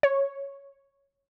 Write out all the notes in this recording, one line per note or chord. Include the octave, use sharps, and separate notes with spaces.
C#5